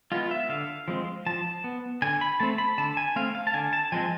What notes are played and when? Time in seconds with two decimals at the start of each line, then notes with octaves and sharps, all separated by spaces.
0.12 G#3 B3 F4
0.31 E5
0.49 D3 F5
0.88 F3 G#3 C4
1.26 F3 A5
1.64 B3
2.02 D3 G#5
2.21 B5
2.40 A3 C4 A5
2.58 B5
2.78 D3 A5
2.97 G#5
3.16 A3 C4 F5
3.35 F5
3.47 A5
3.54 D3 G#5
3.73 A5
3.92 F3 G#3 C4 G#5